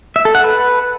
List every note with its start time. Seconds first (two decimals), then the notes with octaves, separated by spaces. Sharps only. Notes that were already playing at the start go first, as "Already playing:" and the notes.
0.16 E5
0.25 A4
0.35 F#5
0.44 B4